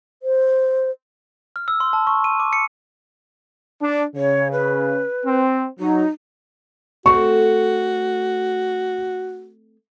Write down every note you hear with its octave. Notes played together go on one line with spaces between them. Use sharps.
C5
F6
E6
C6
A5
C#6
D#7
D6
C#7
D4
C#3 C#5
B4
C4
F#3 D#4
A3 C4 F#4 C#6